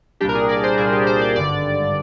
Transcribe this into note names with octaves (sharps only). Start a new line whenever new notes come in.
C2 A#2 G3 D4 G4
A#4
G#4
D5
C5
C2 A#2 G3 D4 G#4
G4
C5
D5
G#1 G2 D3 D5